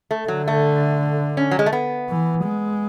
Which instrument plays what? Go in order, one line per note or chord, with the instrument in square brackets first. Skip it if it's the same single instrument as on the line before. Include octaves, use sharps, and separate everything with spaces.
[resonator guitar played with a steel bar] A3
[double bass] D3 [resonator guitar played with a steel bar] F#3
[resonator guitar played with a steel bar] A3
C#4
F#3
G#3
A3
B3
[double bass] E3
G#3